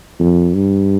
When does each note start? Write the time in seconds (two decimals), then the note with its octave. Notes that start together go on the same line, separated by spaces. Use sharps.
0.20 F2
0.54 G2